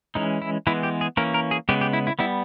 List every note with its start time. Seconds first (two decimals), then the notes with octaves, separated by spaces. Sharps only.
0.15 E3 G#3 C#4 D#4
0.42 E4
0.67 E3 G#3 B3 E4
0.83 G4
1.01 G#4
1.17 E3 A#3 C#4 A#4
1.34 A#4
1.51 G#4
1.69 C#3 G#3 B3 G4
1.81 G4
1.93 E4
2.07 E4
2.19 G3 B3 E4